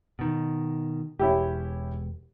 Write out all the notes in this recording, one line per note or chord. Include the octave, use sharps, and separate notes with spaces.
B2 D#3
E1 C#4 E4 G4